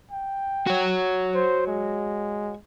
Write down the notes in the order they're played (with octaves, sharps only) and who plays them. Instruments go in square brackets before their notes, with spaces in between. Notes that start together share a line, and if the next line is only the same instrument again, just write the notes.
[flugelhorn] G5
[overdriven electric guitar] F#4 C#5
[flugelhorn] C5
G#3